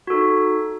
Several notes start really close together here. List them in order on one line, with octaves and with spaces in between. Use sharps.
F#4 A4 D#4